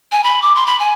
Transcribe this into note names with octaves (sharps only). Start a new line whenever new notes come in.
G#5
B5
D6
C6
B5
G#5